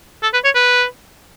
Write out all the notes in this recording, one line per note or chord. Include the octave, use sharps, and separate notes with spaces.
A4
B4
C#5
B4